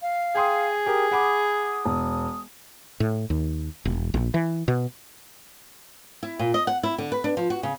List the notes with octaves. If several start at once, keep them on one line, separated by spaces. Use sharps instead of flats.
F5
G#4 G5 C6 D#6
G4 A#4 D#6
F#5 B5 D6
E1
A2
D#2
E1
A#1
E3
B2
E4
A#2
D#5
F#5
E4
D3
B4
D4
F3
F#4
C#3